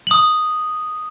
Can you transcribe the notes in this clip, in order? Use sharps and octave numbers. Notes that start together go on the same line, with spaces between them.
D#6 F#7